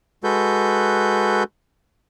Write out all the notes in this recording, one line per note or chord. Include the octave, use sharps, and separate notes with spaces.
G#3 F#4 A4 B4 G6